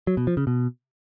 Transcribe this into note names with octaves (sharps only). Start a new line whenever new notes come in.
F#3
B2
F3
C#3
B2